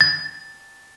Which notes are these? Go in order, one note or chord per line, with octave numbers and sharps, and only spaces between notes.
A6